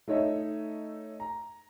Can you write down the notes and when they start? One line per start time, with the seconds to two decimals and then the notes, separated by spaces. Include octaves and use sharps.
0.08 A3 D#4 C#5 D#5 E5
1.20 A#5